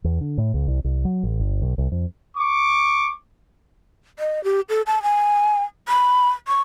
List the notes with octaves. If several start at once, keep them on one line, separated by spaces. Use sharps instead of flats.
E2
D3
A2
C#2
C2
C2
F#3
A1
G1
B1
C2
F2
C#6 D6
D#5
G4
A4
A5
G#5
B5
C#6